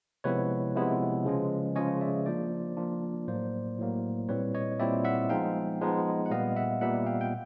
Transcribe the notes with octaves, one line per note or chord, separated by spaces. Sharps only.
C3 F3 G#3 B3 E4 B4 C#5
C3 F3 G#3 B3 E4
C#3 F3 G#3 C#4
C#3 F3 G#3 C#4 C#5 D#5
D5 E5
F3 A#3 D4 F4 C5 D5
F3 A#3 D4 F4
A2 F#3 A#3 C5 D5
A2 F#3 A#3
A#2 G3 C4 E4 B4 C#5
C#5 D#5
A#2 G3 C4 E4 D5 E5
E5 F#5
F3 G#3 B3 D#4 F5 G5
F3 G#3 B3 D#4
F#5
A#2 G3 B3 D#5 F5
E5 F#5
A#2 G3 B3 E5 F#5
F5 G5
G5